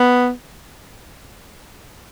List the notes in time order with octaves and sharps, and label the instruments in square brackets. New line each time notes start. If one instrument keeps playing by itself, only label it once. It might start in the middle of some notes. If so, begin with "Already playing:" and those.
Already playing: [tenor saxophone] B3